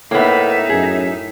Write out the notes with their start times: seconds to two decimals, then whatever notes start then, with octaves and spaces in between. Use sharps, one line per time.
0.11 A2 A#3 B3 D#4 E5
0.69 F#2 G#4 G#5